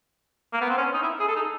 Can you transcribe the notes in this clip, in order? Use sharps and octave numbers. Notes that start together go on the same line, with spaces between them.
A#3
B3
C4
C#4
D#4
E4
G#4
A4
D#4